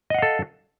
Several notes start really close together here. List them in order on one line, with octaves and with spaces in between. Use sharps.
D#5 F#5 F5 A4